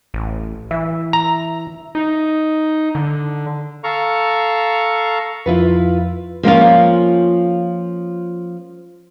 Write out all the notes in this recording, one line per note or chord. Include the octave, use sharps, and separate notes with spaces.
A1
E3 E5
A#5
D#4
D3
A4 F5 A#5 C#6
F2 F3 E4 F4 B4
F3 A#3 C#4 F4